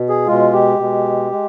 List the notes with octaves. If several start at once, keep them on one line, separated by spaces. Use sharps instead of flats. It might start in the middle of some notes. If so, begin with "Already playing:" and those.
Already playing: B2
G#4
B2 G#3 F4
G4
B2 G#3
G#3